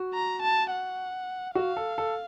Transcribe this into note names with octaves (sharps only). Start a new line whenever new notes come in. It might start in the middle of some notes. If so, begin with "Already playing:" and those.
Already playing: F#4
A#5
A5
F#5
F#4 F5
A4
A4